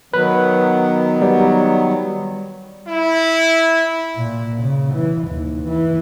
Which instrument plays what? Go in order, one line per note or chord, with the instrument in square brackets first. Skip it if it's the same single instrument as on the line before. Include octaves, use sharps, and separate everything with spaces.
[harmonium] D#3 F#3 B3 [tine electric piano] B4
[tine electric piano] G3
[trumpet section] E4
[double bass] A#2
C#3
E3
D#2
E3